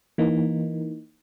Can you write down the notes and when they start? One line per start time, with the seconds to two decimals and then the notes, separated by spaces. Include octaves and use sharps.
0.18 E3 A#3 D#4